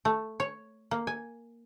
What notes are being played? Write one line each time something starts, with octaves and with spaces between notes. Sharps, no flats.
A3
C#5
A#3
G#5